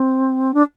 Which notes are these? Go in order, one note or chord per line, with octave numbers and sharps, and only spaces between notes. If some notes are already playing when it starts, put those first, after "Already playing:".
Already playing: C4
D4